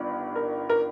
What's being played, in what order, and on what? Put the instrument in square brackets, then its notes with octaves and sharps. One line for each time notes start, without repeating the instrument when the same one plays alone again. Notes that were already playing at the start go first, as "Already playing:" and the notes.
Already playing: [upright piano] G1 G2 D#3
[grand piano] A#4
A#4